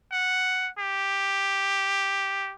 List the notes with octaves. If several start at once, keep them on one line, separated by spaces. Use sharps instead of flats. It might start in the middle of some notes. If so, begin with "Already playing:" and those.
F#5
G4